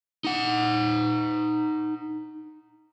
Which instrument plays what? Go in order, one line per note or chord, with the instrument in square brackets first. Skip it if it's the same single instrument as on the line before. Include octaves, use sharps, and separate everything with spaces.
[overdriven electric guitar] D#4 F#5